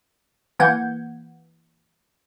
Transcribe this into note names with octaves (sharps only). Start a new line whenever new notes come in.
E3 A#3 F#5 G6 G#6